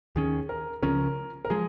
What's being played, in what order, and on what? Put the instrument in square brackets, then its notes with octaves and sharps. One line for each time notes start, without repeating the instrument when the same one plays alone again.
[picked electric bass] D#2 D#3 C#4 [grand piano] G#4
[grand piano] A#4
[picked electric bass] C#2 C#3 F3 C#4 [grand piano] A#4
[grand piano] A#4
[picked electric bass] F3 G#3 [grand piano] G#4